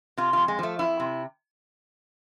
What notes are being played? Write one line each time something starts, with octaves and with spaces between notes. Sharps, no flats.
C3 F4
F2 F4
G#3
F3 A3
F2 E4
C3